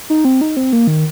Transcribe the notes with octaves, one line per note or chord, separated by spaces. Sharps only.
D#4
C4
D#4
C4
A#3
D#3